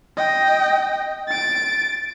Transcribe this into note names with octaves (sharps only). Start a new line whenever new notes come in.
D#5 G5
A6 D7